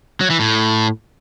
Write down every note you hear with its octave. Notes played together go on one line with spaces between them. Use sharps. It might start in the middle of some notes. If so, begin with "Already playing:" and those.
F#3
E3
A2